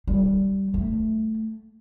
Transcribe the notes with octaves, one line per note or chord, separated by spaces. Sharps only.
G3
A3